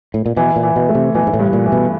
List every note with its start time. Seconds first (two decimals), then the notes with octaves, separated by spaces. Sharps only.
0.14 A2
0.26 A#2
0.37 B2 E3
0.56 A#2
0.63 E3
0.76 B2
0.89 A3
0.95 C3
1.15 B2 E3
1.27 G#2
1.33 A2
1.39 G2
1.53 A#2
1.66 E3
1.72 B2